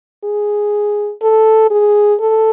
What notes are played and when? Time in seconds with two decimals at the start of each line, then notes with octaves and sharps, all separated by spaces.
0.24 G#4
1.22 A4
1.71 G#4
2.20 A4